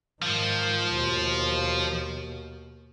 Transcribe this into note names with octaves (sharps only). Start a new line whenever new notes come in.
G#2 D#3 F3
D#2 B2